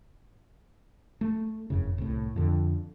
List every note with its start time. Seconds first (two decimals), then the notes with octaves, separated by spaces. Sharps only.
1.21 A3
1.70 F1 F#2 A2 C#3
1.98 C2 A2
2.36 F2 D3